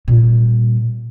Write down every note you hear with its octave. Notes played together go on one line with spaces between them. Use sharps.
A#2 G3